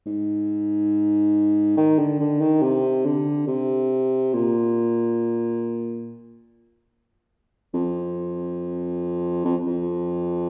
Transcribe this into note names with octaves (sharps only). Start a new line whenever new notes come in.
G#2
D#3
D3
D3
D#3
C3
D3
C3
A#2
F2
F2
F2